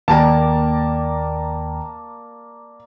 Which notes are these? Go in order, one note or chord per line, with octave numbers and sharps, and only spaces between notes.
D#2 A#3 A#4 D5 G5 A5